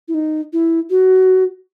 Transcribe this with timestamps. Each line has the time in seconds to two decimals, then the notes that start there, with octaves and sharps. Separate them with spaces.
0.08 E4
0.14 D#4
0.53 E4
0.90 F#4